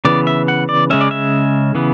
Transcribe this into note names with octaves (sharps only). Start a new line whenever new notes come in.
C#3 E3 B3 D5
E5
F#5
D5
C#3 G#3 C#4 E5
D5
E5
C#3 E3 B3